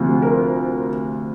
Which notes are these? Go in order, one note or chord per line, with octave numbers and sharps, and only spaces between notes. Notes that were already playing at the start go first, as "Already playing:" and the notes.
Already playing: D2 C3 F3
A#4